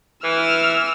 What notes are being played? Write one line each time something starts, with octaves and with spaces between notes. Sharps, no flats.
E3 E6 F6